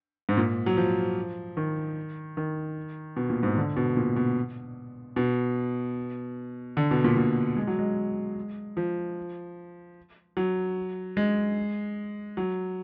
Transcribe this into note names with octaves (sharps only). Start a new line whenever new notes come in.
G#2
A#2
F#3
F3
D#3
D#3
B2
A#2
G#2
D3
B2
A#2
B2
B2
D3
B2
A#2
A#2
G#3
F#3
G#3
F3
F#3
G#3
F#3